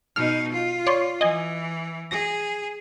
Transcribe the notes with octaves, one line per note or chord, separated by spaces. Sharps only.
B2 D#4 F6
F4
C#5 D5 C6
E3 D#5 G#5
G#4 A#6